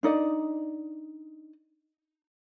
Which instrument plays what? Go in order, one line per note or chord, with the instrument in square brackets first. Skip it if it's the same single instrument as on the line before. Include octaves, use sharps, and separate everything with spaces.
[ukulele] D4 D#4 D5 D#5